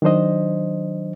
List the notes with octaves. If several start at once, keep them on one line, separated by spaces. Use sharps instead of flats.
D#3 F#3 D4 C5 D#5